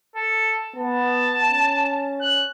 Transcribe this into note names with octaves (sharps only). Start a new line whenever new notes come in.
A4
B3 A5
C#4
F#6